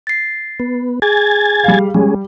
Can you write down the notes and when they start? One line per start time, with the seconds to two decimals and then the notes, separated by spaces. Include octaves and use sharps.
0.07 A6 C7
0.60 B3
1.02 G#4 G#5 G#6 A6
1.64 G3 F5
1.94 G3 G#3 C#4 G#4